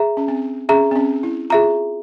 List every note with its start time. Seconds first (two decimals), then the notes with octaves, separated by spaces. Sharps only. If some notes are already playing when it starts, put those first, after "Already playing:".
Already playing: G#4 E5 A#5
0.17 C#4
0.28 C4
0.69 C#4 G#4 E5 A#5
0.91 C4
0.96 C#4
1.23 E4
1.50 F4 G#4 E5 A#5